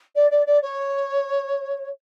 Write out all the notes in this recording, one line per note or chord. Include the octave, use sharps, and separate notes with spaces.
D5
D5
D5
C#5